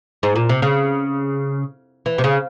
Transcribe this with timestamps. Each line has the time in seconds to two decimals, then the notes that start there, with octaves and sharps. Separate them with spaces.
0.23 G#2
0.36 A#2
0.49 C3
0.62 C#3
2.06 E3
2.18 C3
2.24 C#3